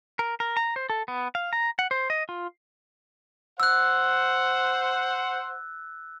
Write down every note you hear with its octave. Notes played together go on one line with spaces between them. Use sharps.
A#4
A#4
A#5
C5
A4
B3
F5
A#5
F#5
C5
D#5
F4
C5 F#5 E6 F#6